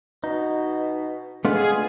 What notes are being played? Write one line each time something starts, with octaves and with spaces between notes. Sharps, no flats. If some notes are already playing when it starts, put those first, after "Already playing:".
B2 D#4
G#3 A3 B3 D4 F4 G#4